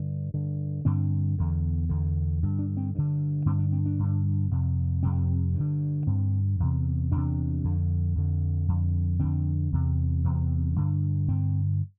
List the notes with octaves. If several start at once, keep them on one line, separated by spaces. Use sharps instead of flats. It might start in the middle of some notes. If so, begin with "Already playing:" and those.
Already playing: G2 D3
G2 D3
G2 D3 C4
E2 D3
E2 D3
G2 D3
D4
C4
G2 D3
G2 D3 C4
D4
C4
D4
G2 D3
F2 C3
F2 C3 C4
G2
D3
G2 D3 C4
E2 C3
E2 C3 D4
F2 D3
F2 D3
F2 D3
F2 D3 C4
E2 C3
E2 C3 C4
G2 D3
G2 D3 C4